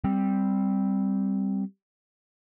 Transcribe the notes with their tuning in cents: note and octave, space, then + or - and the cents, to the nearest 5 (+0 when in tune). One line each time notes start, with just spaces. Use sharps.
G3 +0 C4 +0